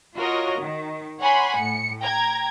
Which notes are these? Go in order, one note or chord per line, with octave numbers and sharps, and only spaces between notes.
F4 F#4 A#4 C#5 D#5
D#3
C#5 F#5 G#5 B5 C6
A2 C#7
G5 A#5 G#6